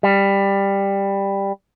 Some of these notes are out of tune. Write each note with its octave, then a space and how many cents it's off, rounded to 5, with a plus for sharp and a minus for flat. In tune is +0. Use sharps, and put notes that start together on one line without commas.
G3 +10